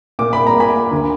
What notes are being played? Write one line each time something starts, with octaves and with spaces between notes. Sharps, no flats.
A#2 D6
A#2 B5
A#5
A#3 G#5 B5
A#3
D2